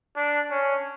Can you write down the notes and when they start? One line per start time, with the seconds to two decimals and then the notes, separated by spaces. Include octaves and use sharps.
0.16 D4
0.51 C#4